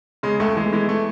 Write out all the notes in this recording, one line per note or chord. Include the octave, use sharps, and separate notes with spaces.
C#3 G#3
C#2 A3
E3 G#3
E3 G#3
A3